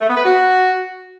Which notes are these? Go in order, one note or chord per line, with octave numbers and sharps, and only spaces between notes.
A3
B3
B4
F#4